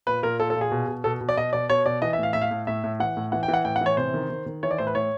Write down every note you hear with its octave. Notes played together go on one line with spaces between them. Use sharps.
A#2 B4
A#2 A#4
A#2 A4
A4
A#2
G#4
B2
B2
B2 A4
B2
D5
B2 D#5
B2 D5
B2 C#5
B2 D5
E3 D#5
E5
A2 F5
A2 E5
F5
A2
A2 E5
A2
E3 F#5
A2
E3 F#5
G5
E3
F#5
A2 G5
F#5
E3 C#5
C3 C5
D#3
D#3
D#3
E3 C#5
D5
A2 C5
B4
A2 C#5